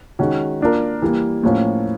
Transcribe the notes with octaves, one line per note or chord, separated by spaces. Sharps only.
D#3 G#3 C#4 F#4
A#3 D4 F4 A#4
E3 G3 A#3
A2 F3 A#3 C#4